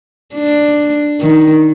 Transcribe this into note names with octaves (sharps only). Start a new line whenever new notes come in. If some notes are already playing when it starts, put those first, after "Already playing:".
D4
D#3